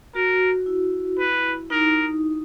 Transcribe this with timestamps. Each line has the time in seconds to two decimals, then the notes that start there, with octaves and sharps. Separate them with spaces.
0.15 F#4 A#4
0.66 E4
1.19 B4
1.70 D#4 A#4